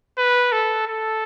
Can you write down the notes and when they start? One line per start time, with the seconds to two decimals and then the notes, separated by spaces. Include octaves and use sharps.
0.18 B4
0.52 A4
0.87 A4